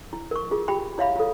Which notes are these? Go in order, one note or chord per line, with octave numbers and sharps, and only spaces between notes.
E4
A#4 C#6
F4 G#4
F4 G4 G5 B5
E4 C#5 E5 F5 B5
F4 A4